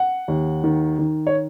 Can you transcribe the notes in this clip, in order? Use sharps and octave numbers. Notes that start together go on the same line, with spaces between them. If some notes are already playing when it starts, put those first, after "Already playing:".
Already playing: F#5
D#2
D#3
D#3
C#5